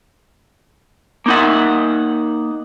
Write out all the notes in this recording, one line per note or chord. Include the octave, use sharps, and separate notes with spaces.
A#3 D#4 F#5